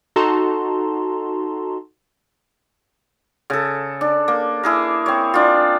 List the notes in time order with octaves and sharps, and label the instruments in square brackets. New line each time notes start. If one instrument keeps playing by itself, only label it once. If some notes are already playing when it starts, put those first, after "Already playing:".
[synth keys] D#4 F#4 A4 A5 A#5 C6
[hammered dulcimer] C#3 A4
D4
A#3
E4 G#4 A#4
C4 C#5
D4 F4